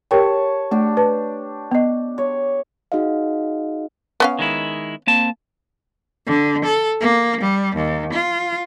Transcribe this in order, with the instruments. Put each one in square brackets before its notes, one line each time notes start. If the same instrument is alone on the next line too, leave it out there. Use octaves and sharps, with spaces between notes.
[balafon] G4 A#4 G5 [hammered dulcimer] C#5 A5
[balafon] A3 [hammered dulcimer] D4 G4
[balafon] B4 A5
B3 D#5
[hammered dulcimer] C#5
[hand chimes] D#4 F#4 G#4 D#5 F5
[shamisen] B3 C#4 F5
[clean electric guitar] D#3 G#3 E4
A#3 C4 A5
[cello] D3
A4
A#3
G3
D#2
F4